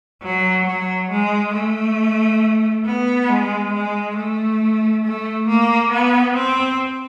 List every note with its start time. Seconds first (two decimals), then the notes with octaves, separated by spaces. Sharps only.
0.22 F#3
0.66 F#3
1.10 G#3
1.54 A3
2.85 B3
3.28 G#3
3.73 G#3
4.17 A3
5.04 A3
5.48 A#3
5.92 B3
6.35 C4